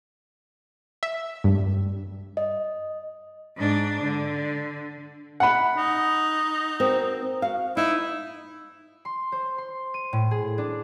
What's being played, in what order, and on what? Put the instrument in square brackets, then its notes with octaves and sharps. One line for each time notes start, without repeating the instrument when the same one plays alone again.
[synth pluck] E5
G2
[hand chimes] D#5
[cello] G#2 D4
D3
[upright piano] F#5 B5
[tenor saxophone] D#4
[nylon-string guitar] C4 F#4 A#4
F#4 F5
[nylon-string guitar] D#4 [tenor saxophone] E4
[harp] C6
C5
C6
D#7
A2
G#4
D4